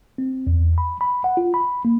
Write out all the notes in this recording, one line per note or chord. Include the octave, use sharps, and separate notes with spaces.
C4
E2
B5
B5
F#5
F4
B5
A#3